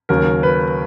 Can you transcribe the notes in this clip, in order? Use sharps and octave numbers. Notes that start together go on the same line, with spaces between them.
D#2 C#3 F#3 A#4
B4